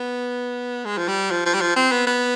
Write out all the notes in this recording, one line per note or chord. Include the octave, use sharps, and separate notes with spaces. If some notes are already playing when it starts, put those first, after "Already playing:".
Already playing: B3
G#3
F3
G3
F3
F3
G3
F3
C4
B3
B3